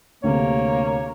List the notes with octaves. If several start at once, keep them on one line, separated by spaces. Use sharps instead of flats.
D2 C3 A#3 C#5